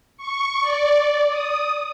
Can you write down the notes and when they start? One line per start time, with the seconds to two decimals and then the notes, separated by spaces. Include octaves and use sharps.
0.17 C#6
0.61 D5
1.30 D#6